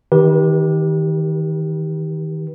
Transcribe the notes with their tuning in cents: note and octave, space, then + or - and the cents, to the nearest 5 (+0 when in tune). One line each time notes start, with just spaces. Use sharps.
D#3 +20 G4 +0 B4 -40